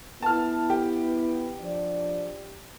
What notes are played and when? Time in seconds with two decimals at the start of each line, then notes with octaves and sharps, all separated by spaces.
0.22 B3 E4 A5 F6
0.70 G4
1.60 F3 D4 D5